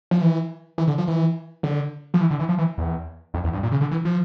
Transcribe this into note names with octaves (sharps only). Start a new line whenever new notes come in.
F3
E3
E3
D3
F3
E3
D3
F3
E3
D3
E3
F3
E3
E2
F2
E2
G2
A#2
C#3
D3
E3
F3